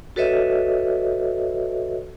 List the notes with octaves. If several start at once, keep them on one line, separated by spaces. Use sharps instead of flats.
F#4 A4 B4 C#5 D#5 E5